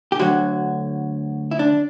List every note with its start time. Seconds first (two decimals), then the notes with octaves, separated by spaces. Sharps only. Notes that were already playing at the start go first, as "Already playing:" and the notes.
0.12 G4
0.19 D2 D3 F#3 F#4
1.51 E4
1.59 D4